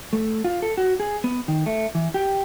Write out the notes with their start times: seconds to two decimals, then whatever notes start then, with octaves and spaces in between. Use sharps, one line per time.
0.13 A3
0.44 F4
0.62 A4
0.77 F#4
1.00 G#4
1.24 B3
1.48 D#3
1.66 A3
1.95 E3
2.14 G4